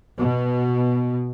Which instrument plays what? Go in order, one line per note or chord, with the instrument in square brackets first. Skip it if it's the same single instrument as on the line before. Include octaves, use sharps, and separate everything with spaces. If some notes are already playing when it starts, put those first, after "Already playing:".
[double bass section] B2